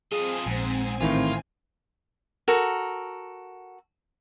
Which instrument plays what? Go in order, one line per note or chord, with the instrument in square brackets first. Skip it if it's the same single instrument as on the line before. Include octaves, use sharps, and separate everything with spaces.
[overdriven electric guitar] F3 D#5 [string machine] C4 G#5 [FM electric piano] G#4
[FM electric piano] A#1 [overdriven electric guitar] G#2
[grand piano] A2 D#3 E3 [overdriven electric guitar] F4
[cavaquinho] F#4 A4 A#4